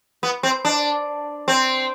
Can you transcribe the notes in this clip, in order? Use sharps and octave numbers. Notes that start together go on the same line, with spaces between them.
B3
C4
D4
C4